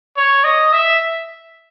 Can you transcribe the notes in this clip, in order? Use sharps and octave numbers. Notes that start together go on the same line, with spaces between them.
C#5
D#5
E5